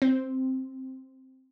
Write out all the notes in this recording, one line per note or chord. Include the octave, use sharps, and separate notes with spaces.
C4